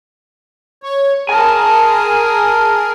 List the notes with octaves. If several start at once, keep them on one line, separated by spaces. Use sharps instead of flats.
C#5
G#4 A#4 G#5 A5